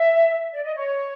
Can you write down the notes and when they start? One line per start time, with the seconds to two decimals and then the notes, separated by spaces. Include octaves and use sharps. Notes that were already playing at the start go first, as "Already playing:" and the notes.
Already playing: E5
0.52 D5
0.64 D#5
0.75 C#5